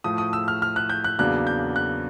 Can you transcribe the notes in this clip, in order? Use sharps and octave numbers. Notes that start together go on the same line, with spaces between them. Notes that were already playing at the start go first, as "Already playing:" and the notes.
A2 F3 A3 D#6
D#6
E6
F6
F6
F#6
G6
F#6
E2 C#3 F#3 A#3 D4 F#6
G6
F#6